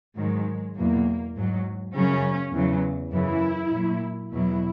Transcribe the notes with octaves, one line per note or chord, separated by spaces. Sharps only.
G#2 D#3 F#3 G#3
E2 B2 F#3 A#3
G#2 F#3
F#2 C#3 F#3 C#4
E2 C#3 F#3
F#2 C#3 E3 E4
A#2 F#3
E2 B2 F#3 E4